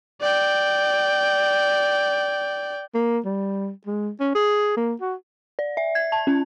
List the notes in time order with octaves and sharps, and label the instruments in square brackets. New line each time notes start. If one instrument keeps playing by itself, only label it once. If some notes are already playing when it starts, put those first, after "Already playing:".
[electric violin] D5 G5
[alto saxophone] A#3
G3
G#3
C#4
G#4
A#3
F#4
[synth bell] D5
E5
G#6
A5
C#4